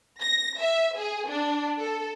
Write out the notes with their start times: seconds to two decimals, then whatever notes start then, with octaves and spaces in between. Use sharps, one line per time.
0.20 A#6
0.59 E5
0.98 G#4
1.28 D4
1.79 A4